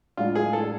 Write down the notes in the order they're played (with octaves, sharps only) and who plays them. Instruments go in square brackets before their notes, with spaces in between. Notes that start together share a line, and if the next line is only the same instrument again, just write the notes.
[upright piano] A2 G#3 D4 [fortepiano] F4
[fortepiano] G#4
A4